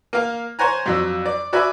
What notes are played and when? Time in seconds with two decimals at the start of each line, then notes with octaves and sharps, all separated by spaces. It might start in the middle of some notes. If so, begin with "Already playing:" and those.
0.13 A#3 F5
0.59 C5 C#5 F#5 G#5 A#5
0.86 F2 F#3 D5 E6
1.26 D5
1.53 F#4 D5 E5 G#5 B5